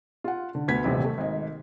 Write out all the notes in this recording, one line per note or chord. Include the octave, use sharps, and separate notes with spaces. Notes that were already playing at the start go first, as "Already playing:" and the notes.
F4 F#5
D3
D2 B3 G#6 B6
D#1 A1 C3
A3
G#1 D#5